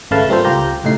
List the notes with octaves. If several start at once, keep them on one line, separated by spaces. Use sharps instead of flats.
G#1 C#3 A3 B4 F5 A5
G3 A#3 C4 F4 A4 C5
C#2 F4 G4 A#5 G6
C#2 A2 D#4 C7